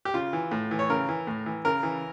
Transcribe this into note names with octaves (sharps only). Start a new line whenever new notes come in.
G4
C#3 F4
E3
A2
E3
C#5
C#3 A#4
E3
A2
E3
C#3 A#4
E3